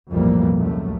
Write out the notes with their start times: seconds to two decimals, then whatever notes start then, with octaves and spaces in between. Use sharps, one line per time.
0.11 B1 F2 A2 E3 G3 A#3
0.57 C#2 F#2 A2 A3